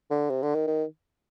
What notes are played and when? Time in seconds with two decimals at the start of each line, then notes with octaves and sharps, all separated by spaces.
0.11 D3
0.30 C3
0.43 D3
0.55 D#3
0.67 D#3